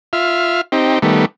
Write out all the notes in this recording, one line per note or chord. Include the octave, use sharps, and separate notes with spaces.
F4 E5 F6
C4 D#4 G4
D#3 G3 A3 B3